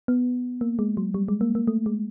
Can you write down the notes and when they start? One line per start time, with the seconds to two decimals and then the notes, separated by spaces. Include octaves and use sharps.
0.08 B3
0.61 A#3
0.79 G#3
0.97 F#3
1.14 G3
1.28 G#3
1.41 A#3
1.55 A#3
1.67 A3
1.86 G#3